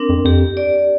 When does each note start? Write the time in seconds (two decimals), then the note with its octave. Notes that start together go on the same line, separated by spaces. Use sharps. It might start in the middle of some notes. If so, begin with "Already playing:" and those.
Already playing: C4 D4 A#4
0.09 F2
0.24 F2 G4
0.57 D5